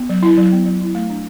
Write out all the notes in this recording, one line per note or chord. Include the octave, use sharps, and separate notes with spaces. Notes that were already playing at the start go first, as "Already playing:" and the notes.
Already playing: B3
F#3
E4
F#3
B3
F#3
E4
A3
D4